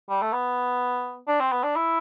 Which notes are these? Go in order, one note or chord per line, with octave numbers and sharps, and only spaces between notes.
G3
A3
B3
D4
C4
B3
D4
E4